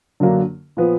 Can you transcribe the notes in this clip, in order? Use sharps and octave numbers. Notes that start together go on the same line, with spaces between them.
F#2 D3 F#3 A#3 D4
A#2 F3 B3